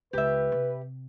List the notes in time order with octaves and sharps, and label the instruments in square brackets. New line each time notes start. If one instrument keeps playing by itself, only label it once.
[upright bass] C#2 [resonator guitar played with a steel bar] G4 E5 [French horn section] B4
[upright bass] C3